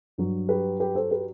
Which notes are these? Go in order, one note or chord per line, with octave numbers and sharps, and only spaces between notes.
G2 F#3
G4 B4
G4 B4
A4 C5
G4 B4